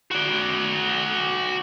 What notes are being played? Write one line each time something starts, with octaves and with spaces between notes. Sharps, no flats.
F#4 D5